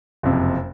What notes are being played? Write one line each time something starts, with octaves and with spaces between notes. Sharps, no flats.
F#1 F2 C3